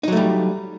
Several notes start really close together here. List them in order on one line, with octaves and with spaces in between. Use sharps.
D#4 F#3 A3 G3